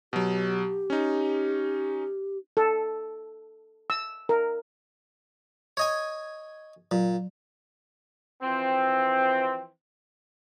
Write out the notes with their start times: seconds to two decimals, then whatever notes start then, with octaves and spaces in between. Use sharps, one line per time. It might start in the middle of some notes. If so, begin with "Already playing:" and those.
0.13 B2 F#3 G4
0.90 C#4 D#4
2.57 A4
3.90 E6
4.29 A#4
5.77 C#5 D#5 G#5
6.91 A#2 F#3
8.43 E3 F3 C4